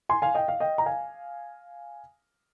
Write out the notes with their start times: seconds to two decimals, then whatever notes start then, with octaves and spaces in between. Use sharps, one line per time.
0.09 G#5 C6
0.22 F5 G#5
0.35 D#5 G5
0.48 F5
0.60 D#5 G5
0.78 A#5
0.86 F5 G#5